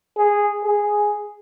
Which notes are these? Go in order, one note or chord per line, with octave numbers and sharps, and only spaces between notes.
G#4
G#4